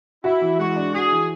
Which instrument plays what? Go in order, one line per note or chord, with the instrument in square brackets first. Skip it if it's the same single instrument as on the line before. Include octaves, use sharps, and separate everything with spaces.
[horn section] E4 [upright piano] F#4
[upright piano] E3
[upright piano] G#3 [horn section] F#4
[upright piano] D4
[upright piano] F#4 [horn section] G#4
[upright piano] E3